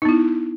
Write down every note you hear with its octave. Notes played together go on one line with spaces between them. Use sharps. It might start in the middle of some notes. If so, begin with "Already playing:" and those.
B3 D#4 E4